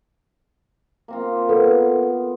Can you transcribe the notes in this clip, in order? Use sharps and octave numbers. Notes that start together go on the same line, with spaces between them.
A#3 C4 F4
B3 A4 B4